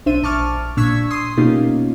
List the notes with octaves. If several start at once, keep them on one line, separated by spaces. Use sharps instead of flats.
B1 D4 C5 E5 D#7
A#1 A5 C#6 D6 F6
A#2 D4 C#6 E6 G#6 B6
C6 D#6 C7
B2 A#3 C#4 D#4 F4 G4